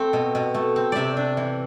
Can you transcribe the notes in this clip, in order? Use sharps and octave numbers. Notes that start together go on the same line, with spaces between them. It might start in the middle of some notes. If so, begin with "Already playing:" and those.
Already playing: A3 C4
B2
B2
A3
C4
C3 D5 E5
D4
E3